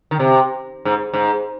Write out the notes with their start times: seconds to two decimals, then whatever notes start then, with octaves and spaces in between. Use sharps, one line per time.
0.11 D#3
0.19 C3
0.85 G#2
1.13 G#2